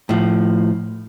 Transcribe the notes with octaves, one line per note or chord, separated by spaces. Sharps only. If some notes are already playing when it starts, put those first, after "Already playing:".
A2 F3